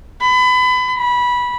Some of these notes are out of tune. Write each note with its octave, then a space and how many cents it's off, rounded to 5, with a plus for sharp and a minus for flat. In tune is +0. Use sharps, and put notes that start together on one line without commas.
B5 +30
B5 -15